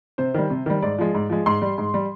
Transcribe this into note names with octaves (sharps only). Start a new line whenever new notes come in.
C3 C5
D#3 G3
C3
D#3 G3
G#2 D5
F3 G#3
G#2
F3 G#3
G#2 C6
G3
G#2
G3